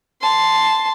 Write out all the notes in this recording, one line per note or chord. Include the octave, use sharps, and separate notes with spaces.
A5 C6